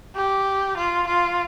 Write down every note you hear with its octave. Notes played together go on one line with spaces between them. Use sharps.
G4
F4
F4